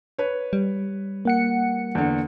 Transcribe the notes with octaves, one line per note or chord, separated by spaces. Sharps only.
B4 C#5
G3
A#3 F#5 C#7
E2 D3